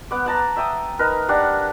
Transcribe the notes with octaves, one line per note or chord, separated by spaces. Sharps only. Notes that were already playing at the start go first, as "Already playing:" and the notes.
B3 F#5 D6
F#5 A5 A#5
E5 G5 D#6
D#4 A#4 B4
D4 G4 F#5